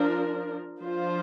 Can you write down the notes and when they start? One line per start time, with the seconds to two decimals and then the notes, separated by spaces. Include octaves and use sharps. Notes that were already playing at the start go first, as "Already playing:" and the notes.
Already playing: F3 D4 A#4
0.81 F3 D4 F4 C5